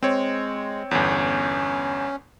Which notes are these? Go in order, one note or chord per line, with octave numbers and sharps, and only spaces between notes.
G#3 C4 C#5
G1 E2 C#4